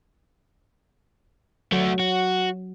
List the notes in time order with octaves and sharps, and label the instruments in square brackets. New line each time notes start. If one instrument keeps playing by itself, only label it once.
[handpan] F#3 [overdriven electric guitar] A3 F#4
[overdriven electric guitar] F#4